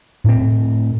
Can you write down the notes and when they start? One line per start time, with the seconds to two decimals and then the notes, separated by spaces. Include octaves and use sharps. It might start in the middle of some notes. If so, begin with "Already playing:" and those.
0.24 A2 C4